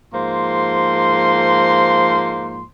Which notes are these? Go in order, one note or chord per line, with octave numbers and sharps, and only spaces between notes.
G#2 F3 A#3 C5 C6